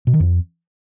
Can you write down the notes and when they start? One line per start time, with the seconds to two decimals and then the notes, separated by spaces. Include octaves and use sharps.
0.07 B2
0.13 D#3
0.20 F2